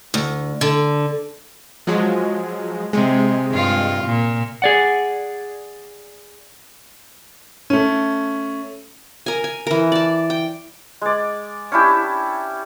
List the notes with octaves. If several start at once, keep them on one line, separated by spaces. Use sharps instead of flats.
D2
D3
F3 F#3 G#3
C3 G#3
G2 F4
A#2
G#4 D5 F#5
A3 C#4
A#4 G#5
G#5
E3 A#4
D5 A5
G5
G#3 D5
C#4 D4 E4 G4